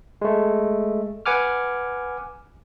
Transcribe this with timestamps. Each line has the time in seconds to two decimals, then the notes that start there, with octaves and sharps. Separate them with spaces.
0.22 G#3 A3
1.26 B4 F#5 G#5 D6 F6